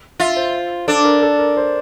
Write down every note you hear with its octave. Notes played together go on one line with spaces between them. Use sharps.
F4 E5
C5
D4 A4
A#4
A4
A#4
C5